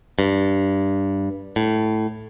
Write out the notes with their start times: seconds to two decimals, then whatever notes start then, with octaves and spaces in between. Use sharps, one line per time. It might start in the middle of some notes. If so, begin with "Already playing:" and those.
0.19 G2
1.56 A2